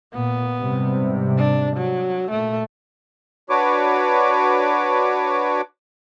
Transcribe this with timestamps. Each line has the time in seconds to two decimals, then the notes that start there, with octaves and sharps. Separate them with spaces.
0.14 A#2 B3
0.58 G#2 C3 G3
1.38 D4
1.76 F#3
2.31 A#2 A3
3.49 D4 F#4 B4 C#5 D6